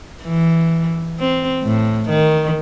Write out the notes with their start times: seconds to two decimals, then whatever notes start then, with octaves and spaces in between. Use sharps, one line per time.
0.23 E3
1.19 C4
1.63 A2
2.10 D#3